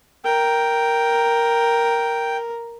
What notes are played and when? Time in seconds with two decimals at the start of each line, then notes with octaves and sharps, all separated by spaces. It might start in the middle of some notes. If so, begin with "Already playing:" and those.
0.25 A#4 G5